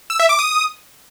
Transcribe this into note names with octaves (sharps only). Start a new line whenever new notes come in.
E6
E5
D6
D#6